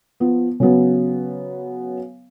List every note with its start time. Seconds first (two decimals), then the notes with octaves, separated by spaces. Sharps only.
0.20 F3 B3
0.60 C#3 F#3 B3